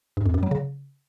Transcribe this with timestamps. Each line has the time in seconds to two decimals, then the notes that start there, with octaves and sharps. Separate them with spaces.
0.17 G2
0.26 F2
0.34 F#2
0.43 F#3
0.51 C#3